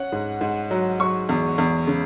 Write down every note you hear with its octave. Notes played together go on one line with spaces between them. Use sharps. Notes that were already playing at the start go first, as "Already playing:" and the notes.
Already playing: C#4 F#5
G#2
G#2
F#3
F#3 C#6
E2
E2
C#3